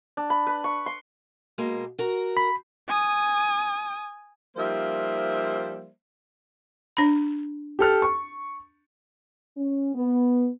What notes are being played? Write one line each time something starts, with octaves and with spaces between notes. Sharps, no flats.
D4
B5
B4
C#6
C6
B2 G#3 A#3
F#4 A#4
B5
G#5 D#6
F3 G3 A#3 D#4 C5 E5
D4 B5
G4 A4 F6
C#6
C#4
B3